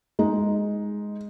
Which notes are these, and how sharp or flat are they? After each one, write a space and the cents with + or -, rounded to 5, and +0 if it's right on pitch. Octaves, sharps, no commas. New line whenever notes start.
G#3 +0 D#4 +5